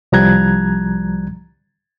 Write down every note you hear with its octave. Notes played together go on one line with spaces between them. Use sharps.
C2 F3 G3 A#5 F#6 G#6